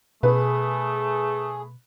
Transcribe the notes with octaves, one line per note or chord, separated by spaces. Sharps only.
B2 A3 G#4 B4